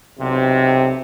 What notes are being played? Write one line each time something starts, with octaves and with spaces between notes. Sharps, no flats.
B1 C3